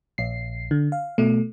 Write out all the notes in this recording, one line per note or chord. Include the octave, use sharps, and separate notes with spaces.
A#1 C7
D3
F5
B2 A3